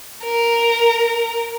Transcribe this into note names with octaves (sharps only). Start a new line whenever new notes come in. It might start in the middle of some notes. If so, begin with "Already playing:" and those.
A#4